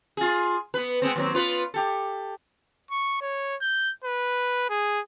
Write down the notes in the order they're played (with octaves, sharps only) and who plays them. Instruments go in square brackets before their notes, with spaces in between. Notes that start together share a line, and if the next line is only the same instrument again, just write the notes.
[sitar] F4 G#4
B3 B4
G#3 B3 C4
D#2 F#3 C4
B3 F4 B4
G4 A4
[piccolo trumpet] C#6
C#5
G6
B4
G#4